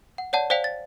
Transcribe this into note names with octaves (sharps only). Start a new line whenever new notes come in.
F#5
C#5 D5 F#5 A5
C5 D5 F5 G5 B6 F7
A6